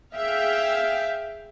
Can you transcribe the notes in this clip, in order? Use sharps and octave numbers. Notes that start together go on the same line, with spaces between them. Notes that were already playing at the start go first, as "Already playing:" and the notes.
G#4 E5 F5 G5